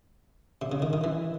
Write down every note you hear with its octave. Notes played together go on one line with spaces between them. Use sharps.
C3
C#3
D#3
D#3
E3